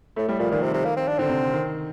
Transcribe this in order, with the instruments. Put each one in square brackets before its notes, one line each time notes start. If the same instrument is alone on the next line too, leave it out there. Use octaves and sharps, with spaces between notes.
[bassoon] A2 [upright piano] A3
[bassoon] A2 [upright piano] G3
[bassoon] A#2 [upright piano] F3
[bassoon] A#2 [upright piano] D#3
[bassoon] C3
C3
A#3
C4
D4
[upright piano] D3 [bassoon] C4
[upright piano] C3
D#3